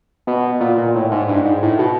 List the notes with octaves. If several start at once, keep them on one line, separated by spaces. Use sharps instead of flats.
B2
A#2
A#2
A2
G#2
G2
G#2
A2
B2